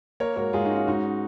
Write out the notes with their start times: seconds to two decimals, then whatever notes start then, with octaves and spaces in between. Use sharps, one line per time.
0.20 A#3 A#4 C#5
0.36 G#2 F#4 A#4
0.53 G#2 F4 G#4
0.65 D#4 F#4
0.71 C#4
0.77 F4
0.87 G#2 D#4 F#4
1.04 C#4